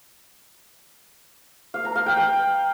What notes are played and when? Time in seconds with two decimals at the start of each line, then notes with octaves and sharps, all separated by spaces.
1.74 F5
1.85 A#5
1.96 F5
2.06 G5
2.17 G5